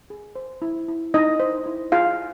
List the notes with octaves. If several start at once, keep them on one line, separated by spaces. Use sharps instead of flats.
G#4
C5
E4
E4
D#4 E4 D#5
C5
E4
F4 G#4 F5